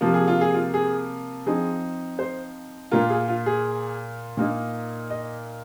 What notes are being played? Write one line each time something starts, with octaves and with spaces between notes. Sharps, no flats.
C3 F3 A#3 F4
G#4
F4
G#4
F4
G#4
F3 C4 D#4 G#4
C5
A#2 A#3 F4 A#4
G#4
F4
G#4
A#2 A#3 D#4
D#5